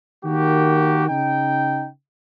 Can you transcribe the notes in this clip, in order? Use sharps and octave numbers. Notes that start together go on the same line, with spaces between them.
D#3 A#3 F#4 G4
C#3 D#4 G5